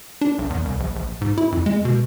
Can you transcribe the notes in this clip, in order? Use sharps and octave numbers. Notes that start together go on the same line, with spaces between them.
D4
B1
E2
C2
A#1
A#1
G#2
E4
F2
G#3
B2